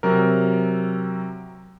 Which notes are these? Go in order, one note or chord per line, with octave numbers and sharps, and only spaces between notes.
C3 F#3 A#4